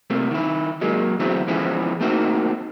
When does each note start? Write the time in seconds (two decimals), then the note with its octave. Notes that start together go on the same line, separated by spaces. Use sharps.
0.10 C3 A3 A#3
0.31 D#3 E4
0.81 F#3 G#3 A#3
1.20 D3 E3 F#3 A3 B3 C4
1.48 D3 E3 F3 G#3 B3 C#4
2.01 A3 A#3 C4 D#4 F#4